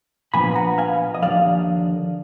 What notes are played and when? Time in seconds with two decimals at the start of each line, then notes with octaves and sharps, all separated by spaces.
0.34 A#2 F3 B3 D4 G#5 B5
0.55 F#5 A#5
0.78 F5 G#5
1.14 D#5
1.22 D#2 D3 F3 D5 F5